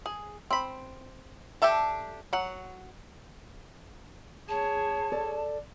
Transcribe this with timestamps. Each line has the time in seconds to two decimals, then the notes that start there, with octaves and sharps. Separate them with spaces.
0.06 G#4
0.50 C4 B5
1.62 D4 G4 A4 E5 A5
2.33 F#3 F#5
4.49 G#4 C#5 A5
5.12 A4 D5